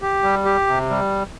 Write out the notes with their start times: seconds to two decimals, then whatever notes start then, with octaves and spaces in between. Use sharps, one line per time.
0.02 G4
0.23 G3
0.45 G4
0.67 C3
0.90 G3